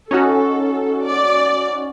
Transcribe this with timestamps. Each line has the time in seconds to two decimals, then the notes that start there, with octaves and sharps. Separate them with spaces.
0.11 C#4 D#4 F#4 A4
1.07 D5